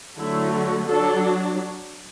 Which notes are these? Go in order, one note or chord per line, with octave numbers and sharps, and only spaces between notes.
D3 F#3 A3 E4
F#4
F#3 D4 A4